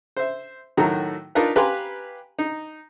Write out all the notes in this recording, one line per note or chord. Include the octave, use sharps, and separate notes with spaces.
C5 E5
A2 D#3 F#3 A3 F#4 A#5
D4 D#4 F4 A#4 B4
G4 B4 F5 G#5 A#5 C6
D#4